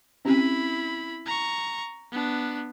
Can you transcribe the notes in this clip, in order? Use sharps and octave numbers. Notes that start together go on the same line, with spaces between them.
C4 C#4 E4 G4 B5
A#5 C#6
B3 D4